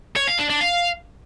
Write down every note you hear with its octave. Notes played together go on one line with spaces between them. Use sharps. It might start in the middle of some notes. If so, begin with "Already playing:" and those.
C#5
F5
D4
D4
F5